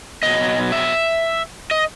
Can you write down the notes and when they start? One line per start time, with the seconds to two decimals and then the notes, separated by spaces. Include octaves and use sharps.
0.23 B2 F#3 D#5
0.72 E5
1.71 D#5